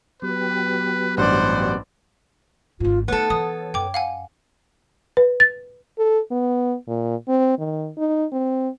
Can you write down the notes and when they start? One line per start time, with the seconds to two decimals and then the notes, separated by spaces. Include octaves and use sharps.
0.22 F#3 B3 G4 B4
1.17 A1 G2 C5 D5 F#5
2.80 G#1 G#2 F4
3.08 A3 B3 D#4 A4 C#5
3.30 E3 D#6
3.74 F#2 G5 D6
3.94 F5 F#5 G#5
5.17 B4
5.40 A6
5.99 A4
6.31 B3
6.88 A#2
7.28 C4
7.59 D#3
7.98 D#4
8.32 C4